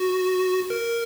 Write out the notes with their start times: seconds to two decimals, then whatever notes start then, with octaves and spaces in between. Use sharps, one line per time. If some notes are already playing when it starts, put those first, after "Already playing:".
Already playing: F#4
0.70 A#4